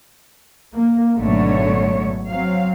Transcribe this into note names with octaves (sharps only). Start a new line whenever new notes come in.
A#3
G#1 B2 D3 F#3 A3 C#5
F#3 C4 F5